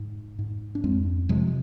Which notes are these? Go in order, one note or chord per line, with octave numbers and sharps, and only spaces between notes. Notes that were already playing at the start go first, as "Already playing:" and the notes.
Already playing: G#2
G#2
D4
F2 G#3 C4
C3 F3 G#3